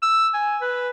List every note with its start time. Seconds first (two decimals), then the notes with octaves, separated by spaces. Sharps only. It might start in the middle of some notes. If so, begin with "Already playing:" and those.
0.02 E6
0.34 G#5
0.61 B4